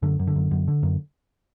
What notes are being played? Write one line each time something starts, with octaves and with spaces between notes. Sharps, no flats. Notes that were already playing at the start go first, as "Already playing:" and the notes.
F#2 D3
F#2
D3
F#2
F#2
D3
F#2